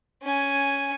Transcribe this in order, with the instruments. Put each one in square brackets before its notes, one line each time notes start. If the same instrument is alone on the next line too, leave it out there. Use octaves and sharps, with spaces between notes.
[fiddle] C#4 G#5